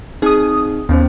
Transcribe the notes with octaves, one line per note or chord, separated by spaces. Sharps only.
C4 D#4 G#4 D#6
D#2 B3 C#4 C5